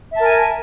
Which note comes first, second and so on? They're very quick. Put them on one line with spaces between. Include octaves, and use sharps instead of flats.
E5 A5 A#4 G#5